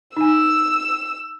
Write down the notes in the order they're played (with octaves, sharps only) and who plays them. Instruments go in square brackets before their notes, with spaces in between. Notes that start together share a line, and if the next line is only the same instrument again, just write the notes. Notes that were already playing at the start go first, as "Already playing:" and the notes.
[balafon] D#4 G#5 [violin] E6